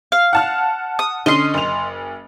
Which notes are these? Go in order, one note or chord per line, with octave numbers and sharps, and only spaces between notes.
F5
F#5 A5 F6
D#6
D3 C#4 D#5 C6
F#1 F7